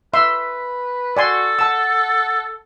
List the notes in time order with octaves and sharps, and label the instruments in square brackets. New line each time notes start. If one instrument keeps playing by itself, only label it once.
[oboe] B4 [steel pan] E5 C6
[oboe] F#4 [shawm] A4 [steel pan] D5 G#5 C6
[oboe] F#5 [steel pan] A5 E6